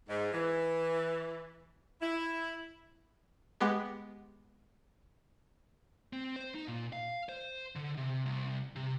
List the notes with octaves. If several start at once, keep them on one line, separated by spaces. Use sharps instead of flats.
G#2
E3
E4
G#3 B3 G4 F#5
C4
C5
D#4
A#2
F5
C5
D3
C3
C2
C3